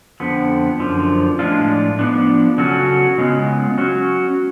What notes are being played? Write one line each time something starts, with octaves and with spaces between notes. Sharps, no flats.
F2 D3 F3 B3
F#2 D3 F3
A2 F3 G#3 D4 F4
F3 B3 D4
C#3 F#3 C#4 F#4 A4
C#3 G#3 B3 F4
F#3 C#4 F#4